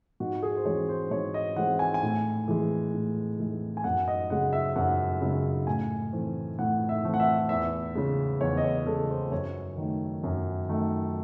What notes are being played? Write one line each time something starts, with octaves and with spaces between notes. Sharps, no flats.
G#2 F#4
G#4
C5
E3 G#3 C4 C#5
C5
G#2 C#5
D#5
E3 G#3 C4 F#5
G#5
G#5
A2
E3 G#3
A2
E3 G#3
G#5
F#2 F#5
D#5
C#3 G#3 F#5
E5
F#2 F#5
C#3 G#3
A2 G#5
E3 A3 C4
A2 F#5
E5
E3 A3 C4
F#5
E5
E2 E5
C#3 G#3
E2 C#5
D#5
C#5
C#3 G#3 A4
C5
F#2 C#5
D#3 A3
F#2
D#3 A3